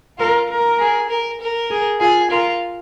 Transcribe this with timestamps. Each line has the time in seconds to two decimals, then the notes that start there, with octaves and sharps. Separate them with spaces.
0.18 F4 A#4
0.49 A#4
0.79 G#4
1.09 A#4
1.40 A#4
1.71 G#4
2.00 F4 G#4
2.30 F4 A#4